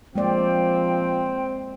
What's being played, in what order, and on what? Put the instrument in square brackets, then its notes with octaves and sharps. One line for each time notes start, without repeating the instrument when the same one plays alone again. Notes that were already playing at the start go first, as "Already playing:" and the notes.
[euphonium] F3 [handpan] G#3 A#3 D5 [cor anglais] C4 [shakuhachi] G5